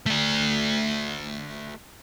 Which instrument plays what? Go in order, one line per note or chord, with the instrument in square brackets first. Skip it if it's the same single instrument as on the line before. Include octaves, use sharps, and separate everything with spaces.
[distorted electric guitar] A3 D5